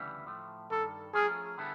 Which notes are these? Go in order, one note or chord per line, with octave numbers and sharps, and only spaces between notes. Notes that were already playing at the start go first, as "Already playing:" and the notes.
Already playing: D2 C#3 E3 G3 B3
A2 F3 A3
G2 D#3 G3 A4
F3 A3 C#4 F4 G#4 A#4
D3 G3 B3 E4 A4